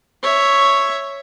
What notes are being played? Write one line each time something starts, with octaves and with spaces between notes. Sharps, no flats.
C#5 E5